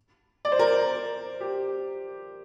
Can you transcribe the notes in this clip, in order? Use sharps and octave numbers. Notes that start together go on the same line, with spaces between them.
D5
C5
A#4
C5
G4